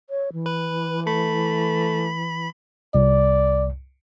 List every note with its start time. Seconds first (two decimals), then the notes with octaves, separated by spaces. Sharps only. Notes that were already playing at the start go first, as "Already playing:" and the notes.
0.10 C#5
0.33 E3
0.46 B4
1.07 A3 B5
2.95 C2 D5